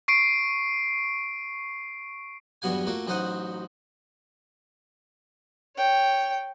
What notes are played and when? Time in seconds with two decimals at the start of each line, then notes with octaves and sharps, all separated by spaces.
0.08 C#6 C7 D7
2.62 E2 G2 B2 F#3 F#5 G#5
2.87 A3 A#3 F4 F#4
3.07 A1 F#3 D#4 C5 F#5 D#6
5.76 C#5 G5